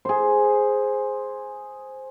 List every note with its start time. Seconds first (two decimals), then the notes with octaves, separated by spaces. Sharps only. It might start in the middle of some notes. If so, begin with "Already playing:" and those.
0.05 G#4 C5